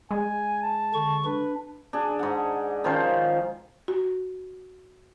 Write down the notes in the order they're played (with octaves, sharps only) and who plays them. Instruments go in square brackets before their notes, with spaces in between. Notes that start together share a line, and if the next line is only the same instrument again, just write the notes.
[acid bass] G#3 [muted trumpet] G#5
[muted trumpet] A5
[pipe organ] D3 C#6
[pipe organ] D4 [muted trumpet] B4
[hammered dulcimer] D4 G#4
G#2 F#5
D#3 F3 C#4 C5
[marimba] F#4